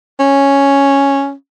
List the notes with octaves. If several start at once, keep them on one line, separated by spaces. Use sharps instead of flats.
C#4